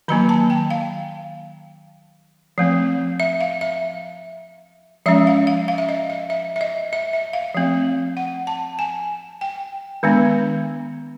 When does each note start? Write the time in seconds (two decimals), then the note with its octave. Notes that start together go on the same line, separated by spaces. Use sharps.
0.08 D#3 F#3 A#3 A#5
0.29 A5
0.50 G5
0.71 F5
2.58 F3 A3 C4
3.20 E5
3.41 F5
3.61 E5
5.06 F3 G#3 C#4 E5
5.27 F5
5.47 F5
5.68 F5
5.78 E5
5.89 D#5
6.10 E5
6.30 E5
6.56 E5
6.61 D#5
6.93 E5
7.13 E5
7.33 F5
7.54 F3 A3 C4
8.17 F#5
8.47 A5
8.79 G#5
9.41 G5
10.03 D#3 G#3 B3 D4